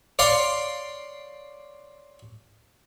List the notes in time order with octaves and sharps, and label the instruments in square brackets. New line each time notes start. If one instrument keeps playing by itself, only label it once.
[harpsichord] C#5 D5 F5 C6 D6